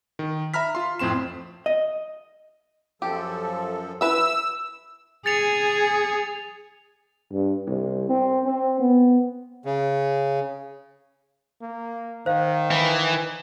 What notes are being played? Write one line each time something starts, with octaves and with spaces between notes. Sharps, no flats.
D#3
E5 A#5 B5 F6 B6
F4 C6
F2 A2 C4 C6 E7
D#5
F#2 F3 G4 A4
E4 B4 E5 E6
G#4 A6 C#7 F7
G2
C2
C4
C4
B3
C#3
A#3
D#3 C5 F5
E3